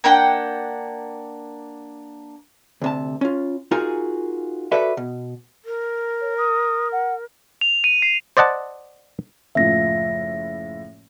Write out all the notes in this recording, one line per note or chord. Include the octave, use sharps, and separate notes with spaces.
A#3 D4 F#5 G5
D2 C3 A5
C#4 F4
D#4 F4 F#4 G#4 A#4 G#5
F#4 A4 B4 D5 E5
B2
A#4
C#5
D#6
F#5
F7
D#7
C7
C5 D5 D#5 F#5 A5
F#1 A2 F3 E5 A#6